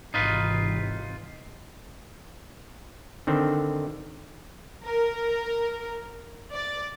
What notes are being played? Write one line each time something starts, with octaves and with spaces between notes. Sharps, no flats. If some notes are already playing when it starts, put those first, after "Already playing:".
G#1 C3 E3 D#4 F4 B4
D3 D#3 C4
A#4
D5